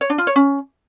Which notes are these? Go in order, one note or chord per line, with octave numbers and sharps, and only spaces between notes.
C#5
D4
F4
C#5
C#4